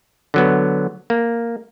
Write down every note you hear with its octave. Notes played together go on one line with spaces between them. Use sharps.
D3 F#3 B3
A#3